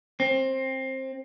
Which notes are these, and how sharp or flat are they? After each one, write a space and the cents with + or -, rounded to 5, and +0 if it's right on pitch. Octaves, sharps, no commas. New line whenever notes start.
C4 +20